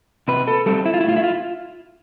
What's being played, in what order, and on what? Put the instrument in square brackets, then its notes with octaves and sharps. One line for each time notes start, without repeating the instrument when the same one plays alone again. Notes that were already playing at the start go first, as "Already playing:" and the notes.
[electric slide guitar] C3 B4
A4
G3 C4 A4
E4
F4
E4
A2 F4
E4
F4